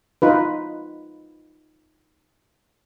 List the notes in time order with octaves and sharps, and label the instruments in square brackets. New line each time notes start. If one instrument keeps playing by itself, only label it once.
[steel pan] D#4 F4 B4